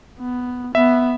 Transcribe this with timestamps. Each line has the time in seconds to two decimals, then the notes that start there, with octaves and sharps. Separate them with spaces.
0.19 B3
0.75 B3 E5